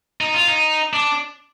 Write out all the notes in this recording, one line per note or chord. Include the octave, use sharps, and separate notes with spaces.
D#4
F4
D#4
D4